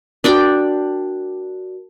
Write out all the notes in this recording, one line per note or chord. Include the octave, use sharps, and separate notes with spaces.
D4 F#4 A#4 D5 G5